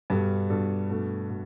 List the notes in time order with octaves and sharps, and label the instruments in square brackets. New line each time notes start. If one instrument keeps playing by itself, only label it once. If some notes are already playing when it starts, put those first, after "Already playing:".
[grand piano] G2 [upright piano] B2 G3 D4 A4
[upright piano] B2 G3 D4 A4
B2 A3 D4 A4
B2 A3